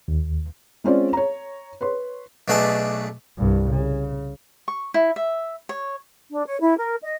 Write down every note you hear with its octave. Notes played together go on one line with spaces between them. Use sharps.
D#2
G#3 C4 C#4 F4 C5 D5
C#5 A#5
B4 C#5 C6
B1 B2 A3 D4 G#4 A5
C2 G2
C#3
C#6
E4
E5
C#5
D4
C#5
E4
A#4
D#5